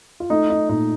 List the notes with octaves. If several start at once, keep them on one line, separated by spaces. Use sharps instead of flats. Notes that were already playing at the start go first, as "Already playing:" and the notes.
F4
A3 D#4
D#4
A#2 D#4